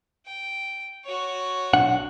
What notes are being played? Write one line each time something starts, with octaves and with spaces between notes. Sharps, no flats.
G5
F#4 C#5
B1 D4 F#5